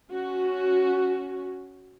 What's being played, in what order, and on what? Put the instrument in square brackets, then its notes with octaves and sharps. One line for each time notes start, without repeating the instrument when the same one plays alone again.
[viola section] C#4 F#4